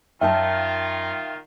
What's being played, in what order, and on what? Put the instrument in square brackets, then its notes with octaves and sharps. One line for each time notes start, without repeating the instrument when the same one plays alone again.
[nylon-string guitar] F#2 D#5 A5 [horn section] D#3 F4 [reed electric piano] E5 G5